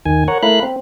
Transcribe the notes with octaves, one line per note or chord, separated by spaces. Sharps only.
D#2 D#3 G#5
A#4 C#5 F#5
A3 E4 A#4 F5 B5 F#6
C4